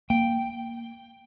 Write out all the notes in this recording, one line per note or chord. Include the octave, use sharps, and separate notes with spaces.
A#3 G5